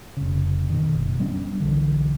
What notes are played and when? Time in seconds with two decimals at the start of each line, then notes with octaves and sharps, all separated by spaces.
0.17 F1 C#3
0.70 B2 D#3
0.94 F#1
1.20 G3 B3 C#4 D4
1.60 B1 D3 E3